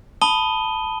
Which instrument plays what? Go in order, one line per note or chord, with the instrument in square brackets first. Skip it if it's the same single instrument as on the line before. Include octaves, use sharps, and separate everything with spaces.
[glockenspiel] A5 B5 D#6 D#7 G7